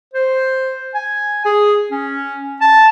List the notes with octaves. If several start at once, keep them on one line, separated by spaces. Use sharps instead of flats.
C5
G#5
G#4
C#4
A5